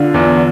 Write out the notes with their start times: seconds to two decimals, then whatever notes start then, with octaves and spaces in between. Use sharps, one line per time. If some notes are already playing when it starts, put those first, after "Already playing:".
Already playing: D3 F4
0.14 E2